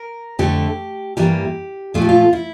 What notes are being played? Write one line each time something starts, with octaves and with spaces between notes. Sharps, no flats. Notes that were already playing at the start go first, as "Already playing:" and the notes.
Already playing: A#4
F2 D3 A3 G4
G2 E3 G3 A#3 G4
A#2 F3 A3 F4
G4
F4
E4